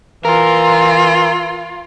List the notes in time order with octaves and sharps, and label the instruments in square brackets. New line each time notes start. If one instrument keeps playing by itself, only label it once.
[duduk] E3 [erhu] F4 [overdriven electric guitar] A#4